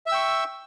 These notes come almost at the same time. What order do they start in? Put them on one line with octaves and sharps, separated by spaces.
E5 E6 G5 C#6